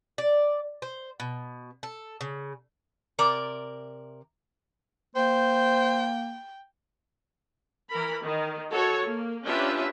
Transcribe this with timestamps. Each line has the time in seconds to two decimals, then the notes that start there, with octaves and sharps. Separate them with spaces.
0.18 D5
0.82 C5
1.20 B2
1.83 A4
2.21 C#3
3.19 C3 A#4 D5
5.16 A#3 C5 G5
7.90 E3 A#4 B5
8.22 D#3
8.70 F#4 A4 C#5
9.05 A#3
9.45 C#4 D4 F4 G4 B4 E5